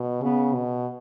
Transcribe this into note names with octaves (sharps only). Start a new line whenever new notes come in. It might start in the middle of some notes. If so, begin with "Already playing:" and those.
Already playing: B2
C#3 B3
B2